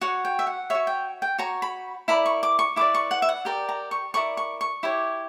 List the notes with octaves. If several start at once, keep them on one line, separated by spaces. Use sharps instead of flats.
F#4 C#5 F#5
G5
E5
F#5
F#4 C#5 E5
G5
G5
F#4 C#5 A#5
B5
E4 A#4 D5 B5
C#6
D6
C#6
E4 B4 D5 D6
C#6
F#5
E5
F#5
G4 A#4 D5 G5
A#5
C#6
E4 A#4 D5 C#6
C#6
C#6
E4 G4 C#5